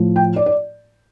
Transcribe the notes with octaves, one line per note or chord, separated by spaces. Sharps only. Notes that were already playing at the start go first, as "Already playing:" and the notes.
Already playing: A2 F3
G5
D5
D5